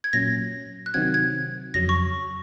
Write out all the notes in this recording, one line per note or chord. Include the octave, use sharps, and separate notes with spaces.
G#6
A#2 F#3 C#4 A#6
F#6
C3 D#3 F#3 C4 F#4 G#6
G#6
F2 C#3 F#3 A#6
C#6